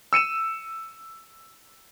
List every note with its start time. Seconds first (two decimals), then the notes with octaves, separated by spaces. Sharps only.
0.13 E6 C#7 D#7 E7